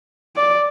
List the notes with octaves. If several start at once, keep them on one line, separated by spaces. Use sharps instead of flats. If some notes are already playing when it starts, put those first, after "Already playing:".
D5